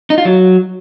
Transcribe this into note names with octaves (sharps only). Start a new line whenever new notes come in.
D#4
F4
F#3